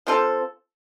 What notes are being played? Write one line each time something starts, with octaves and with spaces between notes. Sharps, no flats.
F3 C4 F4 A4